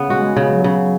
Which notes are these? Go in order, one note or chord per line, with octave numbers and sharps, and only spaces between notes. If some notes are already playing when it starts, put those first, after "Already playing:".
Already playing: C#3 B3
G#3 F#4
C#3
F#3
C#3